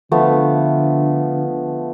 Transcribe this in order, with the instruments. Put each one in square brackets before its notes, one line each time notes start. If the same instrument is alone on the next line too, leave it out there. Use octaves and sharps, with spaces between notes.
[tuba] D3 [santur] F3 A3 B3